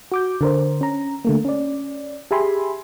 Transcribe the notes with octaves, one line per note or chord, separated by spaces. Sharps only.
F#4 D6 G6
D3 A#4 C5
C#4 A#5
D3 A3 A#3
C#4 D5
G4 G#4 E5 G#5 B5 C6